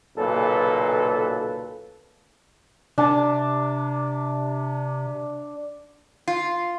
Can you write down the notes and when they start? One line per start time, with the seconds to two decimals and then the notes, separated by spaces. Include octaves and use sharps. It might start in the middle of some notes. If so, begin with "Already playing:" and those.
0.18 B1 A#2 C#3 A4 B4
2.98 C3 D4 A5
6.28 F4